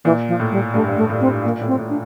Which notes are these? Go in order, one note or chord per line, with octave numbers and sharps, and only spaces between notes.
A#2 E3
F3
A2
G3
G2 A3
G2
A3
A2
C4
A#2 A#3
A2
C4
A2
D4